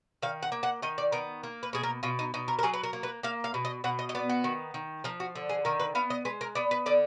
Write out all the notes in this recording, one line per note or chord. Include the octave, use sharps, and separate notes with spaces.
D#3 F5
F#5
A#3
F#5
D#3 D#5
D5
B3 A#4
A#3
B4
B2 G#4
A#4
B2 F4
D#4
B2 D#4
A#4
A#4
F#3 G#4
B4
A#4
A#3
B4
A#3 F5
F5
B2
D#5
B2 F#5
D#5
D#5
B3 D5
F#4
D#3
D#3
F3 A#4
F#4
D3
G#4
D#3 A#4
B4
B3 F5
D#5
G#3 B4
A#4
B3 D5
B4
D3 D5